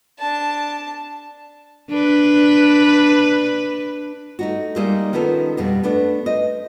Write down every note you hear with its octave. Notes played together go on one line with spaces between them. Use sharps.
D4 A5
D4 B4
A3 D#4 F#4
G3 G#3 A#3 D#4 D5 E5
D#3 F3 B3 C#4 A4
F2 B2 G3
A3 B3 D4
C5 D#5